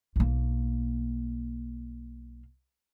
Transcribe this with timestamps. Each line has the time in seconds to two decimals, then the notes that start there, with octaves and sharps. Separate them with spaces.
0.16 B1 A#3